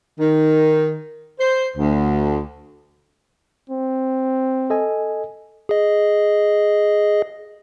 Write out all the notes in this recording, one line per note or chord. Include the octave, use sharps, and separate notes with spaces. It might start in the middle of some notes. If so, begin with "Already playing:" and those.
D#3
C5
D2
C4
A4 D#5 G#5
G#4 D#5